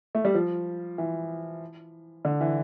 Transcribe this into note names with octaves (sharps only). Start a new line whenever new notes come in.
A3
G3
F3
E3
D3
E3